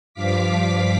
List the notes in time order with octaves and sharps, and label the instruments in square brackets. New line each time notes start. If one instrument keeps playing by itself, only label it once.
[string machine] G2 F3 F5 D6 B6